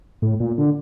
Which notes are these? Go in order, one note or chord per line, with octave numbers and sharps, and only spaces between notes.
A2
A#2
D3